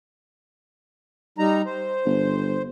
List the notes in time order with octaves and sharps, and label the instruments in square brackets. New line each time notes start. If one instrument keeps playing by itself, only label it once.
[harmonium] G3 D#4 A#5
C5
[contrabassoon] G1